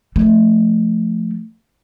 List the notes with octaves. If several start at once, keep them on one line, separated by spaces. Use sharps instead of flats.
F3 A3